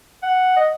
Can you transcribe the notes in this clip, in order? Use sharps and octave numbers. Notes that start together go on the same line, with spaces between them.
F#5
D#5